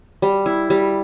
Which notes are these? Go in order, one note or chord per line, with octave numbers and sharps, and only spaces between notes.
G3
E4
G3